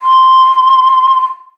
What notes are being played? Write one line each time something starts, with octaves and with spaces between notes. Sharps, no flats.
C6